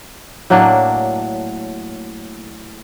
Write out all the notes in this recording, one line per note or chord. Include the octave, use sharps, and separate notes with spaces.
A2 F#3 A#3 D4